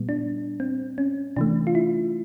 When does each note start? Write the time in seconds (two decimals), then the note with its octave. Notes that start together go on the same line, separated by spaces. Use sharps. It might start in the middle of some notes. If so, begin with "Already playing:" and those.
Already playing: A#2 G3 B3
0.09 D4
0.60 C4
0.98 C#4
1.36 C3 E3 A3 D4
1.67 F4
1.75 E4